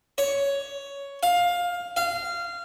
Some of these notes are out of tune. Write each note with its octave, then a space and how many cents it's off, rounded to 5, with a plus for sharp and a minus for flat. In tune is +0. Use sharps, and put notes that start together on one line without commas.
C#5 +10
F5 +15
F5 -20